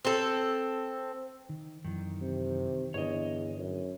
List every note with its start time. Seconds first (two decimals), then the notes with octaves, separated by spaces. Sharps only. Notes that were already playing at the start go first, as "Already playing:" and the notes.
0.05 C4 A4
1.49 D#3
1.85 F#2 D#3 E3
2.21 C3
2.94 G1 E2 D4 C#5 D#5
3.58 F#2